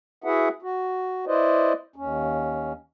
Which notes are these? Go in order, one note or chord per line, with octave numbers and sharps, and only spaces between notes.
E4 F#4 G#4 B4 E5 F#5
F#4
E4 B4 C5 D5 D#5
D#2 C#4